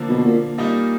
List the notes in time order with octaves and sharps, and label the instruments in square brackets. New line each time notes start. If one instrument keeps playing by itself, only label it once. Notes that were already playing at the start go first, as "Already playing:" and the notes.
Already playing: [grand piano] D3 F3 A#3
[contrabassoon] B2
A#2
[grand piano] A#2 G3 A#3 D#4